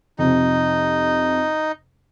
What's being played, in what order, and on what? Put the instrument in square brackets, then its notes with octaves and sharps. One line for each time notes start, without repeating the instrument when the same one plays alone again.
[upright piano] F2 C3 [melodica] D#4